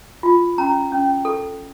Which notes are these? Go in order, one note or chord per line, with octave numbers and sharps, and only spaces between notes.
F4
C#4 A#5
C#4
A4